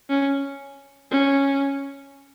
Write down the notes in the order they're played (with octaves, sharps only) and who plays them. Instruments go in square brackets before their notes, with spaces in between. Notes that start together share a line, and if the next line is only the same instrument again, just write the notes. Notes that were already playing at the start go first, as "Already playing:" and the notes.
[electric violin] C#4
C#4